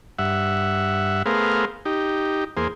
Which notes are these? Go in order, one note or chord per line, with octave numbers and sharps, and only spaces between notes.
G2 E5 F#5
A3 B3 G#4 A#4 C5 F5
D#4 G4
E2 A#3 G#4 C5